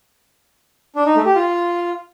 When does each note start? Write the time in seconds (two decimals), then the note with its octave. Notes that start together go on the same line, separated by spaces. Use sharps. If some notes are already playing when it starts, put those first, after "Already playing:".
0.96 D4
1.06 D#4
1.16 A3
1.25 G4
1.35 F4